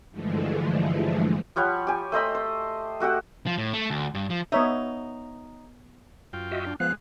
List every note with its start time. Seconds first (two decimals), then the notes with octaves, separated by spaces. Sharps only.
0.11 G2 D3 E3 F3 G#3 A3
1.56 F3 G3 C#5 F#5
1.87 G4 G#5
2.12 A3 C5 D#5 B5
2.35 C5
3.00 A3 F#4 G4 F#5
3.47 F3
3.58 A2
3.73 A3
3.90 D2
4.15 G2
4.30 F3
4.52 B3 D#4 C#5 E5
6.33 F#2 F4 G5
6.51 F#4 D#5 E5
6.67 D4
6.80 F3 G#3 B3 F5 F#6